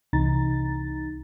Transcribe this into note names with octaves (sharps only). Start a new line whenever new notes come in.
C2 C3 E3 D#4 A#5 A6